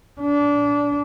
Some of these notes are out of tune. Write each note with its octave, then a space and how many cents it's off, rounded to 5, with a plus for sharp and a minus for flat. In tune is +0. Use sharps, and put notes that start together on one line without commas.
D4 -25